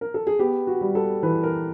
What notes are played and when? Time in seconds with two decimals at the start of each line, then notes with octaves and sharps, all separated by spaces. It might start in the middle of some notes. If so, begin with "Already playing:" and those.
0.01 A#4
0.14 A4
0.27 G#4
0.39 B3 G4
0.67 F#4
0.81 G3
0.95 A4
1.23 E3 B4
1.43 A#4